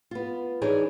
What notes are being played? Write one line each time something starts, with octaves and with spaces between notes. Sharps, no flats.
B3 F4
E3 D4 D#4 G#4 C#5